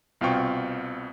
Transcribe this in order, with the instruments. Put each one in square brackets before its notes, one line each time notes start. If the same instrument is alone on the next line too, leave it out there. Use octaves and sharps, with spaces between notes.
[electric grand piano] C2 B2 C4 F4 G5 C#6